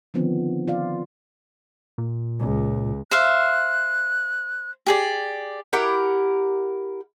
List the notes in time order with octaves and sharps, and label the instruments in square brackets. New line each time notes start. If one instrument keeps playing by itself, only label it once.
[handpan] D3 D#3 F3 B3 C4 D4
F4 D5 F5
[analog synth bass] A#2
[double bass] C#2
[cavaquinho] C5 E5 F5 [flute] F#6
[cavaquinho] G4 G#4 D5
[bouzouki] E4 G4 A#4 F#5